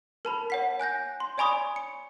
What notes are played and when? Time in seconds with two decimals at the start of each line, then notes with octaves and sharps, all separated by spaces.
0.25 A#4 A5 B5
0.50 C#5 F#5 B6
0.80 G#5 F#6 G6 A#6
1.20 C6
1.38 C#5 D5 G#5 B5 C#6 D#6
1.76 C#7